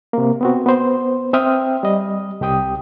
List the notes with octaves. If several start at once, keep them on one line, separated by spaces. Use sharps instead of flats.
C3 A#3
B3 C4 F#4
B3 B4 C5
C4 E5 G5 D#6 F6
G3 D#5
C2 G4 G5 D#6